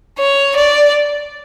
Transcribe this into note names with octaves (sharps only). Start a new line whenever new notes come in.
C#5
D5